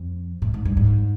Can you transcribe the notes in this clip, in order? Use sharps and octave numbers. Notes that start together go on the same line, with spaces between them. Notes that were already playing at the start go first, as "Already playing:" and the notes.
Already playing: F2
A2
G#2
G2
G#2